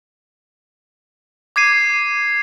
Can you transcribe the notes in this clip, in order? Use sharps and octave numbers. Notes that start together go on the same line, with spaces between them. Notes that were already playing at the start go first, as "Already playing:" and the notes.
D6 G#6 C7 D#7